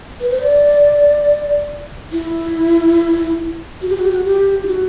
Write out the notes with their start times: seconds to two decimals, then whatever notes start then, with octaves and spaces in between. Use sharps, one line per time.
0.21 B4
0.30 C5
0.40 D5
2.12 E4
3.82 F#4
3.90 G4
3.97 F#4
4.04 G4
4.11 F#4
4.25 G4
4.63 E4
4.68 F#4